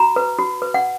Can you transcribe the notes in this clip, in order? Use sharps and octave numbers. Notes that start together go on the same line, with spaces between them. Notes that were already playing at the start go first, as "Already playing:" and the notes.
Already playing: F#4 A#5
B4
F#4
B4
F#5